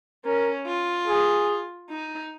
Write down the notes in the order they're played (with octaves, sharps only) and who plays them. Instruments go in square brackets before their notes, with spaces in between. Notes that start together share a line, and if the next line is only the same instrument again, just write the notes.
[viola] C#4 [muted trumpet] A#4
[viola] F4
[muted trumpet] G#4
[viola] D#4